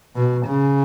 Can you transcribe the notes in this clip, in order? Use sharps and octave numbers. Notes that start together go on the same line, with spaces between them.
B2
C#3